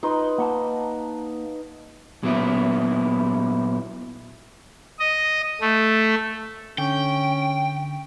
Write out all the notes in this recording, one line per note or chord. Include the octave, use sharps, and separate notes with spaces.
D#4 F4 B4
A#3 F#5 A5
A#2 F#3 B3 E4
D#5
A3
D3 C#4 G5